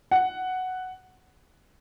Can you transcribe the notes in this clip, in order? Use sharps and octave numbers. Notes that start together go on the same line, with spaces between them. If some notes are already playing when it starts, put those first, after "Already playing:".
F#5